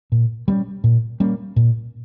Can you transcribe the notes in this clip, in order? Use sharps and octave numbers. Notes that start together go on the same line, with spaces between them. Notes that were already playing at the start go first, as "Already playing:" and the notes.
A#2
G3 A#3 C#4
A#2
G3 A#3 C#4
A#2